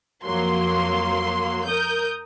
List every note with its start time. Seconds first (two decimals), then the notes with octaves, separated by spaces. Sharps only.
0.23 F2 F3 F#3 A#3 C6
1.67 A#4 D#6 G6